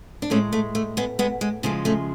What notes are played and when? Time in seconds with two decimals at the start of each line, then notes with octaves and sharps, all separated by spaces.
0.22 D4
0.30 A2 G#3 A3 C#4
0.53 A3
0.75 A3
0.97 G#3 B3
1.19 G#3 B3
1.41 G#3
1.63 C#3 F3 G#3 A3
1.85 A3 C#4